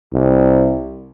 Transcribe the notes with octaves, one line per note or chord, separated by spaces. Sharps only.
C2